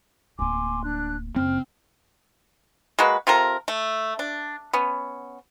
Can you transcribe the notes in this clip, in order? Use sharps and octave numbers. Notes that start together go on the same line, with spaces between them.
D1 A#3 G#5 C6 D6
D4 F#6
F#1 C4 F6
G#3 A#3 F#4 B4
C3 F4 A4 A#4
A3
D4
B3 C#4